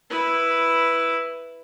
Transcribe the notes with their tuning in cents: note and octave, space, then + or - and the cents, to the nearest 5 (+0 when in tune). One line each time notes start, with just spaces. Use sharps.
E4 +0 B4 +0